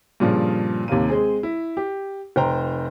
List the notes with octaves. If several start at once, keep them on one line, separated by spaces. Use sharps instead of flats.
G2 A#2 C#3 F3
D#2 C3 A#3 D#7
G#3 C4 G#4
E4
G4
F1 C5 G5 A#5